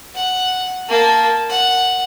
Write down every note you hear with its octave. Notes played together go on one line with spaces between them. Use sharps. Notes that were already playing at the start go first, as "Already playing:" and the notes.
F#5
A#3 A5
F#5